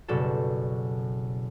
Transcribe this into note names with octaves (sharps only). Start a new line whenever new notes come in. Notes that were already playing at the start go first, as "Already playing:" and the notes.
F#1 B2 G3 F#4 A4 E7